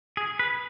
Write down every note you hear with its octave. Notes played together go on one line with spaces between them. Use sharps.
G#4
B4